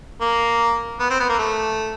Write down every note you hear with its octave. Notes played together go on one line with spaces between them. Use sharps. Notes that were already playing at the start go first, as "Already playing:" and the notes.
A#3
B3
C4
B3
A#3
A3